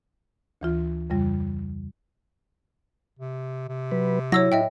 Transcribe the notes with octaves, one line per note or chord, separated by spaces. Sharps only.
D2 E3 F4
F2 C#3 G3 F4
C3
C3
F#3 B4
F#3 E4 C#5 E6 A#6
A2 D#5 E5 G5